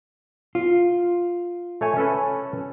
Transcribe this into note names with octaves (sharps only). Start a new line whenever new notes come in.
F4
A3 C#5 G#5
C#4 A4 B4